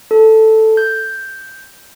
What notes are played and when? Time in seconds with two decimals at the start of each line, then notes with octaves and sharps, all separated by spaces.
0.11 A4
0.77 G6